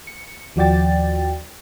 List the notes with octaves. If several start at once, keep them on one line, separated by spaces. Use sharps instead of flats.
C#7
D#2 F3 F#4 D5 G5 A6